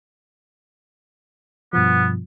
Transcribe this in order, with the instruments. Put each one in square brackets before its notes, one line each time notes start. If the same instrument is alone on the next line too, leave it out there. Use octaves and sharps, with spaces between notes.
[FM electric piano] G2 B2 F3 [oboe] B3